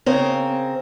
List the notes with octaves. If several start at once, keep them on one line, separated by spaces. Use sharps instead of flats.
C#3 C4 A#4